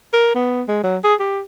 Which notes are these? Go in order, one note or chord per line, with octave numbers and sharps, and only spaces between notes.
A#4
B3
G#3
F#3
G#4
G4